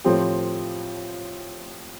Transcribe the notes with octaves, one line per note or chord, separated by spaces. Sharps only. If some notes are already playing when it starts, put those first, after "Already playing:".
A2 F3 C4 G4